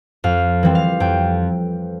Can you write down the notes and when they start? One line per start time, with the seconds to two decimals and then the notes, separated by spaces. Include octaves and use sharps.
0.24 F2 F5
0.63 E3 G3 C4
0.75 F5
1.00 F2 G5